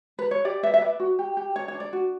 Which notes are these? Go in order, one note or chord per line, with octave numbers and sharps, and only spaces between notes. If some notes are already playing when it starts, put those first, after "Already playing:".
B4
C#5
G4 D5
B4 E5
E5
B4 D5
F#4
G4
G4
D4 C#5
C#5
D4
D5
F#4